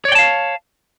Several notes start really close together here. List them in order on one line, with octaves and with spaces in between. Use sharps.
C#5 D5 G5 A5 F5